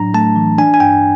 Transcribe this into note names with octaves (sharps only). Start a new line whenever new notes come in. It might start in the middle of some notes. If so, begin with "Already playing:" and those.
Already playing: A2 F#3 D4 A#5
A3 A5
E3
D4 G#5
G#5
G2 G5